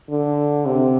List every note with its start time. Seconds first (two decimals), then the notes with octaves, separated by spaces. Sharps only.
0.10 D3
0.66 C3